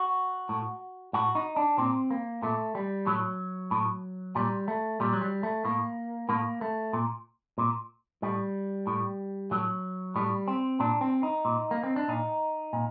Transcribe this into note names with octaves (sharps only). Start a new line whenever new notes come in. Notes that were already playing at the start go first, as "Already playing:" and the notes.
Already playing: F#4
A2
A2 F#4
D#4
D4
A#2 C4
A#3
A#2 A3
G3
A2 F#3
A2
A#2 G3
A3
A#2 G3
F#3
G3
A3
A2 A#3
A2 A#3
A3
A#2
A#2
A2 G3
A2
A2 F#3
A2 G3
C4
A#2 D4
C4
D#4
A#2
A#3
C4
D4
A#2 D#4
A#2